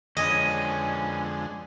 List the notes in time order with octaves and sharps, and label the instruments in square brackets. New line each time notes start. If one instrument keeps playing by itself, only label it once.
[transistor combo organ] F2 D3 G#3 [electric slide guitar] B3 C#4 [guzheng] D#5